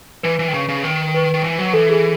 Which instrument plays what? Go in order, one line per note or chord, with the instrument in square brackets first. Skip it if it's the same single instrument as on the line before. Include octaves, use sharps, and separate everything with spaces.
[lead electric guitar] E3 [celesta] B4
[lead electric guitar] E3
D#3
C#3
C#3
D#3
[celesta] B4
[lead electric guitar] D#3
E3
F#3
[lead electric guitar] E3 [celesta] A4
[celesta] G#4